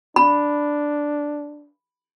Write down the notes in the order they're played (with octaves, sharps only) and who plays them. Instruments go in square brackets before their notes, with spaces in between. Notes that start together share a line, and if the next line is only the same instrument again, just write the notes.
[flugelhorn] D4 [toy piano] B5